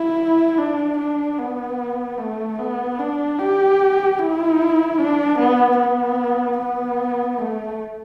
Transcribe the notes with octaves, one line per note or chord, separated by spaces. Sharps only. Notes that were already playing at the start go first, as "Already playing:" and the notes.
Already playing: E4
D4
D4
B3
A3
B3
D4
G4
E4
D4
B3
B3
B3
A3